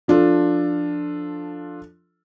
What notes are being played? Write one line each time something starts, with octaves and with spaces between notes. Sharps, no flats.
F3 D4 F4 A4